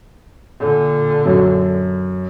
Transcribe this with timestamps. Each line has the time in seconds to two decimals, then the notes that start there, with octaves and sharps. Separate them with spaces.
0.59 A#2 D3
1.26 F#2